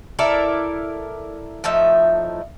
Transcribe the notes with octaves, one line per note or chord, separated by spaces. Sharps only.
E4 A4 A#4 D5
A2 F3 D#4 E5